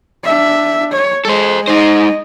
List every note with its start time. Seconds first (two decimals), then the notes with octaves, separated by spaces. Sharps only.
0.24 D4 E5
0.92 C#5
1.25 G#3 A4 C5
1.68 G#3 D#4 C5 D#5